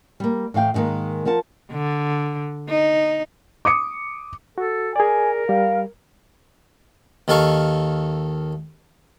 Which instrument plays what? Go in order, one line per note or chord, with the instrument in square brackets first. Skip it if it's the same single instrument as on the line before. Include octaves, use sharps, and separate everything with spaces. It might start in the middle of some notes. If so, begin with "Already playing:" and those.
[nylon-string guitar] G3 A#3
A2 E3 F5 G5
G#2 D3 D#3 G#3 A#3
F3 A#4 F#5 A5
[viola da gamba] D3
D#4
[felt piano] D6 D#6 C#7
[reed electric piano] F#4 [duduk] A4
[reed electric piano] G#4 D5 [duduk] A#4 [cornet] G#5
[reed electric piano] G3 [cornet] F5
[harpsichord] D#2 D#3 A4 F5 C#6